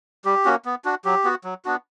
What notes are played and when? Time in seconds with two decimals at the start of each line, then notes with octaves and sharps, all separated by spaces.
0.25 G3 G4
0.45 A#3 C#4 F#4
0.65 B3
0.85 D4 F#4
1.05 F#3 G4
1.24 B3 F#4
1.44 F#3
1.65 B3 D4 F#4